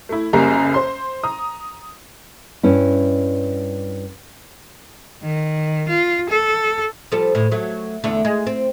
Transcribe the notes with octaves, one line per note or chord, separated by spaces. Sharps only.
A3 E4
F#1 F#2 G3 A#3 A#5
C5 C6
A#5 D#6
G2 C#4 E4
D#3
F4
A4
F3 G3 A4
D2 A2
F#3 A3
E2 D3 A3
G#3
C4